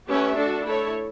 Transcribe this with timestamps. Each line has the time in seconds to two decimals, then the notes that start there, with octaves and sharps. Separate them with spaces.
0.08 A3 C#4 G4 B4 E5
0.37 D4 F#4 A4
0.67 A3 E4 A4 C#5